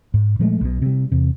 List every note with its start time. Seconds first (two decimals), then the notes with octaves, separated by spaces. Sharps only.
0.14 G#2
0.39 A#2 F3 G#3 A3
0.61 B1 B2
0.82 C3 G3
1.12 E2 C3